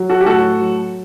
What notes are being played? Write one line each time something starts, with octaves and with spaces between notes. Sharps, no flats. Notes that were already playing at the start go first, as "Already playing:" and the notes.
Already playing: F#3
F#4 A4
G4
A2 F#4 A4
F#3